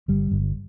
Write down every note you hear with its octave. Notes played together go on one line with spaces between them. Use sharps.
G1 G3
G1